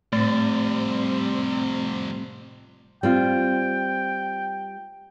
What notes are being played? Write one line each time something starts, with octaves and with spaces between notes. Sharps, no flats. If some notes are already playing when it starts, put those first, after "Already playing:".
F2 A2 C3 G3 A3 C4 A6
G3 C4 F4 G5